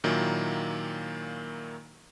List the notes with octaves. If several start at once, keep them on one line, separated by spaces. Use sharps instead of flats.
A#2 D#3 F#3 A#3 E4